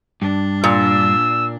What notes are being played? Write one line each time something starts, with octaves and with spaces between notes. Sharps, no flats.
G2 D4
A#2 E6